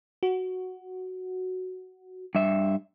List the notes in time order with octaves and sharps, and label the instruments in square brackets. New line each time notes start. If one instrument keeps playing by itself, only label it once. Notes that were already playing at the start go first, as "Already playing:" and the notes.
[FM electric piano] F#4
[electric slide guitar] G2 E5